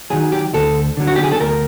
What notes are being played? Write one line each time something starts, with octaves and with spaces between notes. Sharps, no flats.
D#3 F#3 G#4
G4
D2 A4
D3 F#3
F#4
G4
G#4
A4
D2 A#4